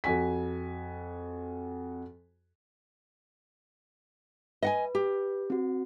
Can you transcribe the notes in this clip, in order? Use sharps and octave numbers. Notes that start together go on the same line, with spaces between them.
F2 F#4 G#5 B6
B4 D#5 F#5 G#5
G4
C4 F#4